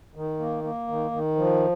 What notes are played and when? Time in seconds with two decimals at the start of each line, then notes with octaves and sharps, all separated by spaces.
0.15 D#3
0.39 A#3
0.63 A#3
0.88 D#3
1.11 D#3
1.36 F3